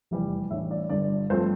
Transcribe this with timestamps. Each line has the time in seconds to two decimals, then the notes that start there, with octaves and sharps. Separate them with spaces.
0.11 F1 E2 C3 E3 G3
0.51 A1 A2 E3 G3 D4 E5
0.71 D5
0.89 G1 G2 D3 D5
1.30 G2 F3 A3 C4 C5